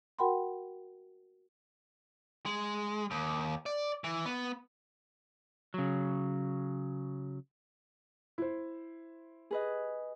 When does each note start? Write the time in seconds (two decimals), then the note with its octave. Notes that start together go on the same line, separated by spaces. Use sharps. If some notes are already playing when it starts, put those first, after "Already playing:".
0.19 F#4 A#4 F#5 G5 B5 C6
2.46 G#3
3.11 D#2
3.66 D5
4.04 E3
4.26 B3
5.74 C#3 F#3
8.38 E4 C5
9.51 G#4 B4 D#5